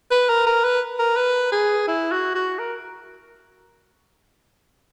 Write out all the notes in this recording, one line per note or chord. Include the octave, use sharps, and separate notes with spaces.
B4
A#4
A#4
B4
A#4
B4
G#4
E4
F#4
F#4
A#4